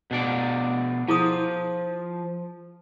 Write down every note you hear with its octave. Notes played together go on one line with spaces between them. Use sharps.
B2 D4 D5
F3 E4 G#4 D#6